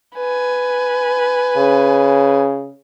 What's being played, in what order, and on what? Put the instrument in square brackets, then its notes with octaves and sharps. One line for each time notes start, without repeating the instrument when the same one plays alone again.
[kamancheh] B4 G#5
[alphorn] C#3